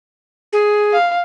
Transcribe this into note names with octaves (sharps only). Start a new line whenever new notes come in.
G#4
F5